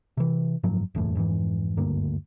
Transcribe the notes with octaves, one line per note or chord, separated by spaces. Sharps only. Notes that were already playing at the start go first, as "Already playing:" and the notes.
C3 E3
F#1 G#2 F3 F#3
F#1 E2 A2
F2 G#2 D#3 E3
F#1 D2 G2 A#3